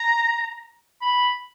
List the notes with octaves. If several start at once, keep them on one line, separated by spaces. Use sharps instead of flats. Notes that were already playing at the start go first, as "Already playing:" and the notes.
Already playing: A#5
B5